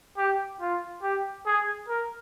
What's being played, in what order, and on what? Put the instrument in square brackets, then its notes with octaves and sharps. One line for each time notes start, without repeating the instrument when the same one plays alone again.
[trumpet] G4
F4
G4
G#4
A#4